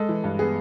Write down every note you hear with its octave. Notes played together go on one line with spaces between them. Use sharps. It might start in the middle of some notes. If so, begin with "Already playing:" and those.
Already playing: G#3 A4
E3
G2
B3 G#4